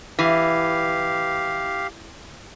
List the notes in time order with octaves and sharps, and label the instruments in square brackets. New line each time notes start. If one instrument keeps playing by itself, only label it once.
[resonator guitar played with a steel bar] E3 [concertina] G4 F5